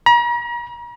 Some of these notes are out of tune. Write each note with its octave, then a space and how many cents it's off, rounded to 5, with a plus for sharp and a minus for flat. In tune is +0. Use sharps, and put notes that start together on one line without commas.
A#5 +40